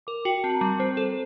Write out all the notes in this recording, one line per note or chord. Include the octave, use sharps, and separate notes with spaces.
A#4 D6
F#4 G5
C4 A5
A#5
G3 A5
C4 C5
A4